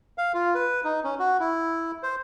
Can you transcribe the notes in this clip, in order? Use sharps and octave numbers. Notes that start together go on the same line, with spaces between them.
F5
F4
B4
D#4
C#4
F#4
E4
C5